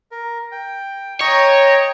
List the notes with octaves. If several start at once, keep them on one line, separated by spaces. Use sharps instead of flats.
A#4
G5
C#5 D#5 G5 A#5